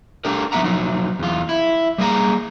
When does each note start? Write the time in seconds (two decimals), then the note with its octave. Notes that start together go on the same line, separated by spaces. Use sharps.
0.25 D4 G4 A4 A#4
0.52 F3 B3 E4 E5 F#5 A#5
0.64 F3 F#3 D#4
1.19 E2 F4
1.49 E4
1.98 G3 A#3 G#4 A#5